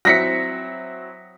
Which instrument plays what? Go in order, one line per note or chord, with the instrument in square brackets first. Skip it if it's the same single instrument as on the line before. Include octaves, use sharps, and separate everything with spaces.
[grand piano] F#3 C4 E4 [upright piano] A#6 B6 C#7